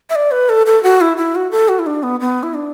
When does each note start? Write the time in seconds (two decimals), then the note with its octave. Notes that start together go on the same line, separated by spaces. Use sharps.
0.10 E5
0.15 D5
0.31 B4
0.49 A4
0.66 A4
0.83 F#4
1.01 E4
1.17 E4
1.35 F#4
1.51 A4
1.69 F#4
1.79 E4
1.86 D4
2.03 B3
2.20 B3
2.43 E4
2.54 D4